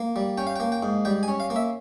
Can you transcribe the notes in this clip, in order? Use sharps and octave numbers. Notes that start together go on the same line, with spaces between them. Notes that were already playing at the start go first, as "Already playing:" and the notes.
Already playing: A#3
G3
C#4 G5
F5
G5
A#3
G5
G#2
G3 G5
G#5
C#4
F5
A#3
E5